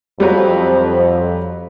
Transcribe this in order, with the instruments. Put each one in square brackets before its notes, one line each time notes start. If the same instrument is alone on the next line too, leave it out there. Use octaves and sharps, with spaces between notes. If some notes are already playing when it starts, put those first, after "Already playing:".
[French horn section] F2 [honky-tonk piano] F#3 G3